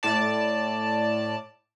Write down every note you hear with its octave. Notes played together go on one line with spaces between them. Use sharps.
A2 D5 A5